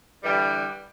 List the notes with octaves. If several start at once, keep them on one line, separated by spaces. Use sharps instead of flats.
D3 E3 G3